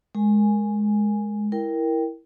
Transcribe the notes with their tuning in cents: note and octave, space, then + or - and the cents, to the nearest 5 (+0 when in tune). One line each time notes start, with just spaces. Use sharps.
G#3 +10 A#4 +0 G#5 +0
E4 +0 A#4 +5 G5 +5